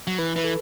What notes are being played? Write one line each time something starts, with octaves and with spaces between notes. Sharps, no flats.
F#3
E3 B4
E3 B4
A4